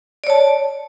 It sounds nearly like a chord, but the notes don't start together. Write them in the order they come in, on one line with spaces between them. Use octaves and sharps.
D5 C#5 A5